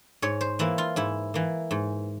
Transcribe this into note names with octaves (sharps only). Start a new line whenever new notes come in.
G#2 C#5
C5
E3 A#3 E4
F4
G#2 E4
E3 A#3
G#2